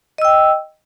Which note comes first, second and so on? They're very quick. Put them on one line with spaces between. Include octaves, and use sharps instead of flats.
D#5 E6 G5